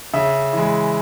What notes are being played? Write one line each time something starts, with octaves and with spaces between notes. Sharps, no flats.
C#3 E5
E3 G#3